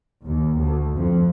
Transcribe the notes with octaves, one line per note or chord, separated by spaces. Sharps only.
D#2
D2
F2